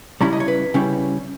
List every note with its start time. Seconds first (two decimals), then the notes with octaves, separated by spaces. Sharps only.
0.21 C#3 G3 C#4 E4 A#5
0.33 D#5
0.40 C#5
0.48 B4
0.74 C#3 G3 C#4 E4